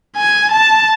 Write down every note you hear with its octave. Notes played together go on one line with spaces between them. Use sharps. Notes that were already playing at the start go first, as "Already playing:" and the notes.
G#5
A5